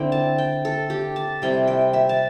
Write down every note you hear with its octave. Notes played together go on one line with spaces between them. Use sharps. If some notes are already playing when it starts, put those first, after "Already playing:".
Already playing: D3 C4 E4 G5
A5
G5
A4
G4
A5
C3 G3 C4 E4 G5
G5
E5
A5